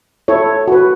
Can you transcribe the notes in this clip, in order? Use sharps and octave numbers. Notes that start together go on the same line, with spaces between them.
E4 A4 C#5
F#4 B4